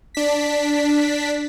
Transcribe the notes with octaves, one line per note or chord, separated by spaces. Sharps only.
D4 B6